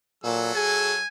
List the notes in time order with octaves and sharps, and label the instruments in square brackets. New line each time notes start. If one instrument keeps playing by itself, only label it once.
[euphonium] A#2 [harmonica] F#3 A4 E6
[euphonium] G#4 [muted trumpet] G#5